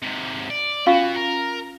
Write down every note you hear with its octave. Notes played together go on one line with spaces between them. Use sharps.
G#2 C3
D5
B3 C#4 F4 F#4 F5 C#6
A#4